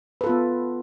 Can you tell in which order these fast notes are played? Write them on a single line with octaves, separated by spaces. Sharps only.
B4 A4 F4 B3